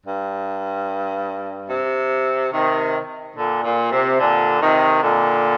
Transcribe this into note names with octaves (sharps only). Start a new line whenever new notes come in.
G2
C3
C3 D#3
A#2 D3
A#2
C3
A#2 D3
C3 D#3
A#2 D3